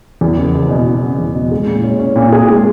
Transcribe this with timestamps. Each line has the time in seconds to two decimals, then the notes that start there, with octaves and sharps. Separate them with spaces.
0.21 E2
0.38 F#1
0.54 F#1
0.71 B2
0.87 B2
1.03 F#1
1.19 E2
1.35 B2
1.52 G#3
1.67 A#2
1.84 C#4
1.99 C#4
2.16 A#2
2.32 G#4
2.49 G#3